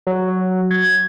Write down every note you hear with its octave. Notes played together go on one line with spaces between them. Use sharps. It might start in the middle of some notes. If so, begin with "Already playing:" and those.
F#3
G#6